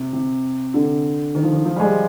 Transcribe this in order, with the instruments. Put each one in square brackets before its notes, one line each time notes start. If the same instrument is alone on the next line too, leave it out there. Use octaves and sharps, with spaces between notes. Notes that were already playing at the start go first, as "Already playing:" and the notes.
Already playing: [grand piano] C3
C3
D3
D#3
F3
D#3
F3
G3
G#3